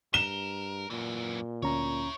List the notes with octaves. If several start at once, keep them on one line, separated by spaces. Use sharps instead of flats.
G2 A#4 E7 G7
F#2 A#2 E3
D2 C#4 E4 C#5 A#5